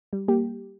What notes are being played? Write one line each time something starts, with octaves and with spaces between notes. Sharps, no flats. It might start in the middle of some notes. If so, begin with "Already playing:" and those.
G3
A#3 G4